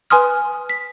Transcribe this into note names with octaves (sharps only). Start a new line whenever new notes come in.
B4 G#5 C6 D#6 F6
B6